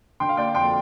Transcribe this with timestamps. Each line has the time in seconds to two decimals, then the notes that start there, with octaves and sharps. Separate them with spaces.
0.20 D3 G5 C6
0.29 F5
0.37 A#3 D5 G5
0.55 F2 G5 C6